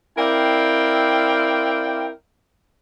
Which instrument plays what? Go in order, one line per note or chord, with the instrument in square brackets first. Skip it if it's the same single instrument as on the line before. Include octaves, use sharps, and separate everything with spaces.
[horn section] C4 E4 A#4 D5 F5 G5